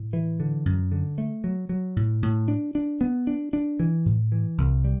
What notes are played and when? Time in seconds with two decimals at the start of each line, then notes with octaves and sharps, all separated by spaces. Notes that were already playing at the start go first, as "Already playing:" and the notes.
Already playing: A2
0.13 E3
0.40 D3
0.65 F#2
0.92 D3
1.18 A3
1.44 F#3
1.69 F#3
1.96 A2
2.22 A2
2.48 D4
2.75 D4
3.01 B3
3.27 D4
3.53 D4
3.80 E3
4.06 A2
4.32 E3
4.58 C2
4.84 G3